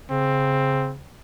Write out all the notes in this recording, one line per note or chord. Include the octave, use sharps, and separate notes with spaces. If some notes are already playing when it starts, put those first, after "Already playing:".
C#3 C4